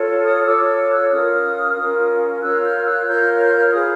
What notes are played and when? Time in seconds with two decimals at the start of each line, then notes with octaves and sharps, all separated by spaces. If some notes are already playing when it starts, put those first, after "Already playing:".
Already playing: F4 A4 C#5
0.25 D#6 F6
0.46 F4 A4 C#5 D6 E6
0.69 D6 E6
0.90 E6 F#6
1.12 C#4 F4 A#4 D#6 F6
1.77 C#4 F4 A#4
2.42 F4 A#4 C#5 E6 F#6
2.64 F6 G6
2.85 E6 F#6
3.07 F4 A#4 C#5 F6 G6
3.40 F6 G6
3.72 F4 G#4 B4 D#6 F6